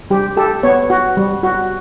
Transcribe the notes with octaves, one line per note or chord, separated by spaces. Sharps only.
G3 G4
G4 A4
B3 C#5
F#4
G3
F#4